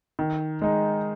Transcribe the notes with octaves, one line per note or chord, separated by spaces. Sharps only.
D#3
G#3 D#4